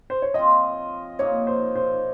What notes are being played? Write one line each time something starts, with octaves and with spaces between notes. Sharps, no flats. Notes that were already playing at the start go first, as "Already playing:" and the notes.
C5
C#5
F3 C4 F4 D#5
A#2 F3 A#3 D#4 C#5
C5
C5